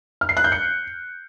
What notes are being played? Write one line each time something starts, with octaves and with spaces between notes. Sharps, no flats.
F6
C7
F#6
G6
C#7